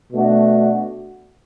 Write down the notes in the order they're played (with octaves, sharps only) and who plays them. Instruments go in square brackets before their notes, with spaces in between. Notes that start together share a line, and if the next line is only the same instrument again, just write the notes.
[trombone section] B2 A3 D4 F#4